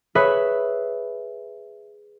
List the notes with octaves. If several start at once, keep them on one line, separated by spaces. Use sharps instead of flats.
G#4 B4 C#5 E5